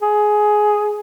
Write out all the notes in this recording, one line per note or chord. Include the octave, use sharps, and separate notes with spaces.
G#4